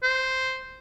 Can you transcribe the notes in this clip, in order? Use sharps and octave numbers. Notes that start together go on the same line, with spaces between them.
C5